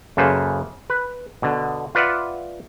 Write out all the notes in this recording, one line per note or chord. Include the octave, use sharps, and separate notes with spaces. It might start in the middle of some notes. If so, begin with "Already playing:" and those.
F#2 C#3 A#3 A4 B4 C5
B4
B2 D3
F4 B4 D5 E5 F#5